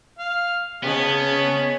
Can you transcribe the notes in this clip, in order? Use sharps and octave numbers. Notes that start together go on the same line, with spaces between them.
F5
C#3 B3 C#4 G#4 D#5 A5